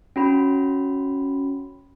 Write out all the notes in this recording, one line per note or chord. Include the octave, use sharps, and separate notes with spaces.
C#4 F#4 B5